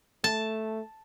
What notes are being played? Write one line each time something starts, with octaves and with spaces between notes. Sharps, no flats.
A3 A5